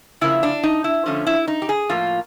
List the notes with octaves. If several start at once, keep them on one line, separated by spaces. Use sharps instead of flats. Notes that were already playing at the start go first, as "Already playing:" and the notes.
C#3 F3 A#3 E4
D4
D#4
E4
D3 F3 A3 C#4
E4
D#4
G4
G#4
A2 F3 A#3 F4